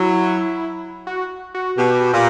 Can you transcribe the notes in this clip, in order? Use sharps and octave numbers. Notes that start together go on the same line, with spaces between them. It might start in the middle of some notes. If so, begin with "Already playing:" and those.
Already playing: F#3 E4
F#4
F#4
B2 G4
A#2